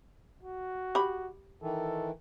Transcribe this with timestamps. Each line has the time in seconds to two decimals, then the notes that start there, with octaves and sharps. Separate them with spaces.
0.43 F#4
0.95 G4 B5
1.62 D#3 E3 A4